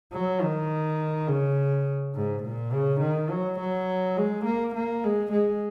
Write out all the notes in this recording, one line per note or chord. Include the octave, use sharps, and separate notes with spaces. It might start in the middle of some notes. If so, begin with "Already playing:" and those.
F#3
D#3
C#3
G#2
A#2
C#3
D#3
F#3
F#3
G#3
A#3
A#3
G#3
G#3